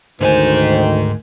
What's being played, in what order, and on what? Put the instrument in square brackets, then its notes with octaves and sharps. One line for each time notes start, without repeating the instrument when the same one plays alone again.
[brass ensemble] D2 D#3 [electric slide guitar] G#2 A4 G#5 [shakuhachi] C5